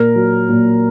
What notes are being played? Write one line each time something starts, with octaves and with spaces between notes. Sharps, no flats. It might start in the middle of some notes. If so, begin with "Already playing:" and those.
Already playing: A#2 A#4
F#3
A#2